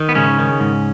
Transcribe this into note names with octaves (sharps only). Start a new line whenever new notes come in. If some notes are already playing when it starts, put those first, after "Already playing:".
Already playing: D#3
B3
G#2 C#3 C#4
D#3
G#2